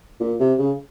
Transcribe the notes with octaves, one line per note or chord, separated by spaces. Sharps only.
A#2
C3
C#3